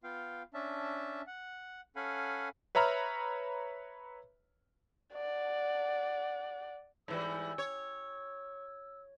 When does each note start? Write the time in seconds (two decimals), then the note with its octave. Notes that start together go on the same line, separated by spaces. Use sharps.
0.04 B3 F4 F5 G5
0.54 C#4 D4 E5 A5
1.27 F#5
1.96 C#4 A4 F5 F#5 G#5 B5
2.75 B4 C#5 E5 A#5 B5 F6
5.14 D5 F#5
7.08 G#2 E3 G3 E6
7.58 C#5